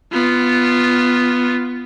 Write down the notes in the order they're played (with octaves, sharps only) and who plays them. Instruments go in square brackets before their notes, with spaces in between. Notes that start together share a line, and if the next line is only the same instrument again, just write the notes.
[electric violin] B3 F4